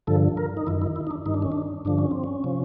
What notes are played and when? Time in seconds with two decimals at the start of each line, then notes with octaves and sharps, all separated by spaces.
0.07 G2 D3 F3 A4
0.37 A#4
0.57 D#4
0.67 F#2 D#3 E4
0.82 E4
0.96 E4
1.07 D#4
1.11 D4
1.26 G2 D#3 D#4
1.34 D4
1.42 C#4
1.52 D4
1.85 G2 D3 F3 D4
1.98 C#4
2.11 C4
2.24 C#4
2.44 C3 F3